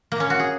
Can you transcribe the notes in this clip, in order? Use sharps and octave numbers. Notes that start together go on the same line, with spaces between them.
A#3
C#4
F#4
G#4